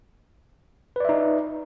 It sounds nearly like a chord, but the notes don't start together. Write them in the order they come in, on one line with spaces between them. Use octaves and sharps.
B4 D5 E5 D#4